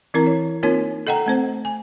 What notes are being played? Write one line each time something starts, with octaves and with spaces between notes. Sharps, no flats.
E3 C4 E4 A#4 A#5
C#5
A#3 C4 D#4 F4 A#4 C#5
A4 D#5 F#5 G5 A#5
A3 C4 C5
G#5